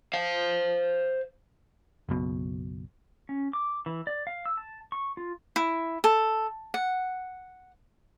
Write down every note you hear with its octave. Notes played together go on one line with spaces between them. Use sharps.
C5 F5
F#1 B1 B2
C#4
D6
E3
D5
F5
E6
A5
C#6
F4
E4
A4
F#5